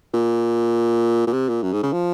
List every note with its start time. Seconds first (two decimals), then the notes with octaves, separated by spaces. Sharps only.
0.14 A#2
1.27 A#2
1.33 C3
1.48 A#2
1.63 F#2
1.72 G#2
1.83 C#3
1.92 F3